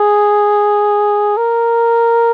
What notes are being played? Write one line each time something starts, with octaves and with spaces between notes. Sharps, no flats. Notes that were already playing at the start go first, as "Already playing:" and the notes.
Already playing: G#4
A#4